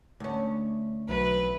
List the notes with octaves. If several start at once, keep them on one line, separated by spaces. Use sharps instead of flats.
D2 C#4
B1 E3 F#3 B4